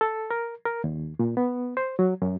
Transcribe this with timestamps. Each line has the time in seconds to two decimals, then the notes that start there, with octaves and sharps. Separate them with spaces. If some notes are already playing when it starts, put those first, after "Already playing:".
0.01 A4
0.31 A#4
0.66 A#4
0.84 D#2
1.19 A#2
1.37 B3
1.77 C5
1.99 F#3
2.22 F#2